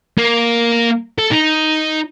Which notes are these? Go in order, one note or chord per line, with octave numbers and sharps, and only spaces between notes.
A#3
A4
D#4